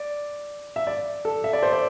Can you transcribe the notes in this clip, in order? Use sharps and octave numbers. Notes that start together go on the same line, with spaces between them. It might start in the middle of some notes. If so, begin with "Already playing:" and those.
Already playing: D5
E5
D5
A4
E5
D5
C5
D5